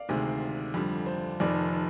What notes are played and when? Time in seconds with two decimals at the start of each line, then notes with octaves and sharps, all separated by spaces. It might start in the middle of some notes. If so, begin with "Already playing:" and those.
Already playing: D5 F5
0.09 D2 C3 D#3 G#3
0.74 F2 D3 G3
1.06 C5
1.40 F1 F2 D#3 D5